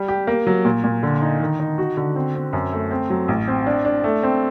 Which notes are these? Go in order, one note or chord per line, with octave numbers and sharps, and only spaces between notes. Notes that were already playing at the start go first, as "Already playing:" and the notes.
Already playing: G3
G4
A#3
F#3
A#2
A#2
D3
D#4
D#3
D#4
F#4
D3
C4
C4
F#2
A3
C4
F#3
A1
C4
D4
D4
A3
C4